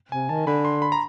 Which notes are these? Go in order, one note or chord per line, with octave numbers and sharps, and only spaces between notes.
C3 G#5
D#3 A5
D3 B5
C6
B5
A#5